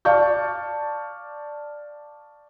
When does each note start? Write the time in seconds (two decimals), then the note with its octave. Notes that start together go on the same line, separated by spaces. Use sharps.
0.05 D5 F5 A5 C#6 G6